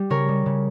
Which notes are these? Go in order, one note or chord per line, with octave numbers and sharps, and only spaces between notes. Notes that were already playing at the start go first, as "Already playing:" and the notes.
Already playing: G3 G4
C#3 A#4 C#5
G3
C#3